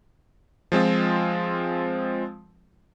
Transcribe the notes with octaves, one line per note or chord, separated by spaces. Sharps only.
F3 G#3 C4 F4